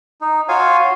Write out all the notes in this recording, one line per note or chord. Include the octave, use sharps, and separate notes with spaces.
D#4
F4 F#4 C#5 F5 G#5